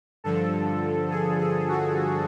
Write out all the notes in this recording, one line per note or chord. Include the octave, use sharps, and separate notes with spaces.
G2 D3 F3 A4
G#4
G#4
F#4